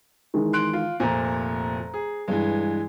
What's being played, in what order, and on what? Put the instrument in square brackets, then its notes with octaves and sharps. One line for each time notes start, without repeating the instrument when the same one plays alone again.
[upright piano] D#3 E3 G#3
[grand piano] C6 F#6 D7
F4
[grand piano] F1 A#2 [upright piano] C5 A#5
[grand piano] G#4
[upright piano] G2 [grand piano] E3 G#3